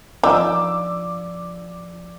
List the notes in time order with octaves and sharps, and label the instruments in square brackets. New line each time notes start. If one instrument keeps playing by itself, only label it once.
[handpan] F3 F4 D5 [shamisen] D#4 [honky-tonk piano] D6 E6